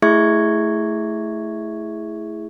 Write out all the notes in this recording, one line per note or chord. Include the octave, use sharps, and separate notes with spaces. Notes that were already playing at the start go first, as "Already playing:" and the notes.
A3 E4 G#4 E5 C#6 G#6